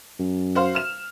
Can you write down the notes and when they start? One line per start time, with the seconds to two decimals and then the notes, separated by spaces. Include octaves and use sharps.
0.19 F#2
0.55 F#4 C5 F5
0.75 F6 E7